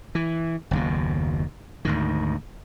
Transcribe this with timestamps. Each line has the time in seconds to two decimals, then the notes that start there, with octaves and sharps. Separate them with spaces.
0.15 E3
0.71 F#1 D#2 B2
1.85 D2 G#2 D#3